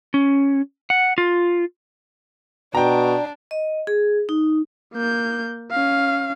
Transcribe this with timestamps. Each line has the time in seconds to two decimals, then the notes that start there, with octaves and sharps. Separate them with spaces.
0.14 C#4
0.90 F#5
1.18 F4
2.75 B2 D4 G5 A#5
3.51 D#5
3.87 G#4
4.29 D#4
4.94 A#3 G6
5.71 C#4 F5